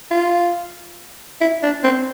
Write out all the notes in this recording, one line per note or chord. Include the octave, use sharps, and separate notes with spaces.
F4
E4
D4
C4